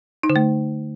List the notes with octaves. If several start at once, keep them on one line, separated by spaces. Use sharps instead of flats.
D#4
D3
A3